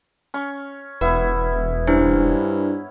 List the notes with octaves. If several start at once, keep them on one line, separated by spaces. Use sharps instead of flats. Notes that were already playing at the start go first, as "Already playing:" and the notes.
C#4 C#6
E1 B3 E4 B4
G2 C#4 D4 E4 C5